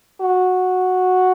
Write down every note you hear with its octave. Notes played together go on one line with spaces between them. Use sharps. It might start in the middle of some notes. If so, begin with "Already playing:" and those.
F#4